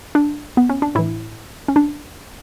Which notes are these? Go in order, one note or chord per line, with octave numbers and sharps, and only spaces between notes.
D4
B3
C#4
D4
A2 E3 E4
C#4
D4